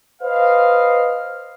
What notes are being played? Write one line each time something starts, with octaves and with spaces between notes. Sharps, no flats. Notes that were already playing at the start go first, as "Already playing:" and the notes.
B4 C5 D#5 F5